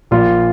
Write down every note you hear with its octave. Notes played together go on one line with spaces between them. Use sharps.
A#1 A#2 F4